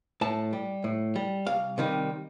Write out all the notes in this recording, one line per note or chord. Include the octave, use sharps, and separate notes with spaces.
A2 A5
G3
A2
G3
C2 F5
C3 D#3 G3